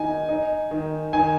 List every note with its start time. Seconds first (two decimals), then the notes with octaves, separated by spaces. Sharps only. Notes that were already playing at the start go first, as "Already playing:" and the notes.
Already playing: D#3 D#4 G#5
0.29 D#4
0.71 D#3
1.13 D#3 G#5